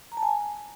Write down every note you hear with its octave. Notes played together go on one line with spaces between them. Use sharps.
A#5
A5
G#5